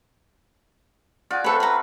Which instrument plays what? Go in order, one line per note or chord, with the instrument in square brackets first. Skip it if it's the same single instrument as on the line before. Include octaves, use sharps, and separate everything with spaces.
[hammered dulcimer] F4 F#4 G#4 [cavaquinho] D5
[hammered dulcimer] A3 C4 C#6 [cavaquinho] A4 B4
[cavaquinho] B4 A#5